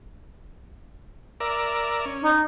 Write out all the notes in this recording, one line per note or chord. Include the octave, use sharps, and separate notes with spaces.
A#4 D5 E5
C#4
D#4